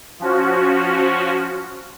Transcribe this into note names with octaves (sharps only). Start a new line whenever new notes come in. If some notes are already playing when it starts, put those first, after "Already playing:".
F3 C#4 F#4